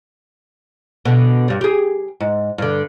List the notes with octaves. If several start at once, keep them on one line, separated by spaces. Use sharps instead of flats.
B2 D3
G2 G3
G4 G#4
G#2
G2 D3